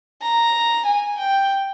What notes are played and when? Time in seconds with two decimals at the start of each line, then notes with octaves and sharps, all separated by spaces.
0.22 A#5
0.85 G#5
1.17 G5